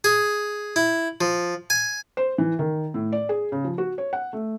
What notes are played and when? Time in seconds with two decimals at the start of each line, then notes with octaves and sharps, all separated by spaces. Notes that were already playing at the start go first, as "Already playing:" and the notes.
0.04 G#4
0.76 E4
1.21 F3
1.70 G#5
2.17 C5
2.38 E3
2.59 D#3
2.94 A2
3.12 D5
3.29 G#4
3.52 C#3
3.64 F3
3.78 F#4
3.98 C#5
4.13 F#5
4.33 A3